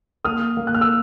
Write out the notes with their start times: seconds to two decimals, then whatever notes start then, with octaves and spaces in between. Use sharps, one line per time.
0.25 A#3 D#6 F6
0.57 A#3
0.67 F#6
0.75 F6
0.81 E6